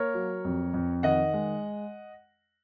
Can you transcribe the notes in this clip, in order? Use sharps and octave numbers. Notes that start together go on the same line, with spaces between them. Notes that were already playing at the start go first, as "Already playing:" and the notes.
Already playing: A#3 A#4 C#5
F#3
F2
F2
D#3 D#5 F#5
G#3